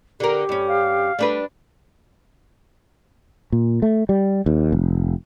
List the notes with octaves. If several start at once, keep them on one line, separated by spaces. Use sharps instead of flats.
D3 G4 A#4
G2 C#4
F5
G3 A3 D4 B4
A#2
A3
G3
D#2
F1